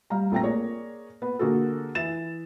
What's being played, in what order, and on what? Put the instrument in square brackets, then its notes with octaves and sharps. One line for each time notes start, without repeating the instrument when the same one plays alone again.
[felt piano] G3 F5 A#5
A#1 A3 C4 G5 A#5 A#6
A#3 G#4 C#5 D5
B3
D3 A#3 F#4 G#4 A4
E3 E5 A6 E7